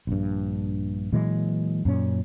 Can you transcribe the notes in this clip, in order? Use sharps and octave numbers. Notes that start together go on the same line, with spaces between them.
A#1 G2
A#2 E3 F#3 G#3
F#2 A#2 C#4